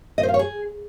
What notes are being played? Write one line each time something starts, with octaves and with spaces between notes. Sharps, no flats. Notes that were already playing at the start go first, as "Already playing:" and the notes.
D#5
C5
F5
C#5
G#4